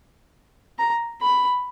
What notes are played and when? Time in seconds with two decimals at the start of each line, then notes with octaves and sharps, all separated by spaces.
0.79 A#5
1.22 B5